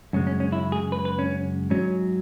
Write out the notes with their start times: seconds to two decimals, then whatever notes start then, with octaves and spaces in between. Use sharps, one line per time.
0.13 F#2 C#3 G#3 C#4
0.27 C#4
0.40 C#4
0.52 E4
0.72 G#4
0.92 B4
1.05 B4
1.19 C#4
1.70 G#2 F#3 C#4